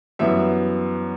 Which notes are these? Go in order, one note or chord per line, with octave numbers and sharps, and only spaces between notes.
F#2 E3 G3 B3 E5